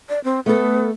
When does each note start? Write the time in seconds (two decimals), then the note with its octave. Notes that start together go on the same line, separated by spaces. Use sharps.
0.09 D5
0.24 C4
0.46 A3 B3 A4